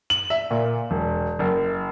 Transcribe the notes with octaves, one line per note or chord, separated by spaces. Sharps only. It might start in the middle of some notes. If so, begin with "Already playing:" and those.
F#7
E5
A#2
E1
F#1